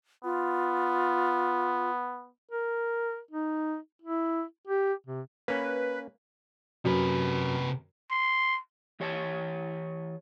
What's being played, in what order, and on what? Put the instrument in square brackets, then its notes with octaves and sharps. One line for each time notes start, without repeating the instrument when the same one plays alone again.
[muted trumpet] B3 [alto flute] F4
[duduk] A#4
D#4
E4
G4
C3
[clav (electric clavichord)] A#3 C#4 [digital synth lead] B4
[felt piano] F#2 [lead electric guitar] C3 B4
[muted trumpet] C6
[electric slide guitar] E3 G4 C#5 F#5 A5